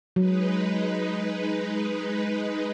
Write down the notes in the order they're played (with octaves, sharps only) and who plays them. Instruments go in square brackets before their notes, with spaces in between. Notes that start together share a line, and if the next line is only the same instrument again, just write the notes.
[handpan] F#3 [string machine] G#3 D#4 B4